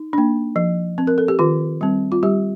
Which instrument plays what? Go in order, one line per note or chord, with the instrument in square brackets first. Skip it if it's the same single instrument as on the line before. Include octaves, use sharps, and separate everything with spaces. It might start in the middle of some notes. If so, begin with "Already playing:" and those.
Already playing: [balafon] D#4
A#3 D4
F3
C4
A#4
A4
G4
D#3 F4
G3 C4
F4
G3 G4